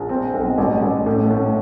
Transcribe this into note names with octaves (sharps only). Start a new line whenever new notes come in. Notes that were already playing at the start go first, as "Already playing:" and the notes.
Already playing: A#1
C4
B1
A1
A1
A2
A2